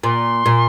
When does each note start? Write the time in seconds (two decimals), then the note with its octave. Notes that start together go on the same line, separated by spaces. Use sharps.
0.03 A#2 C6
0.46 A#2